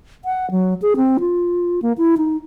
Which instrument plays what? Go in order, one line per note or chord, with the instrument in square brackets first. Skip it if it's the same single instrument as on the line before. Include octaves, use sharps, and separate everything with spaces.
[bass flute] F#5
F#3
G#4
C4
F4
A#3
E4
D#4